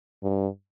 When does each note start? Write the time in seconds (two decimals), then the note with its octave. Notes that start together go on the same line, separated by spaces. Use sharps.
0.23 G2